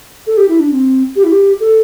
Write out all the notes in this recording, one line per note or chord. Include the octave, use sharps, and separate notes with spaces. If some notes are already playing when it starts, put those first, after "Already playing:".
A4
G4
E4
D4
C4
G4
E4
G4
A4